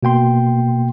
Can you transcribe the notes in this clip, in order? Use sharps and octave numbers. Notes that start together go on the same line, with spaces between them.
B2 A#3 G5 C6